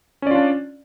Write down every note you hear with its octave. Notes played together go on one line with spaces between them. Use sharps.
C#4 D4 F4 D5